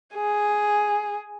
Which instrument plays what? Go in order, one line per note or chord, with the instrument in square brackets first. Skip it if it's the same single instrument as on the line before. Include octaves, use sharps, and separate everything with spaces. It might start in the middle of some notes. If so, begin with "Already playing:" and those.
[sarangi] G#4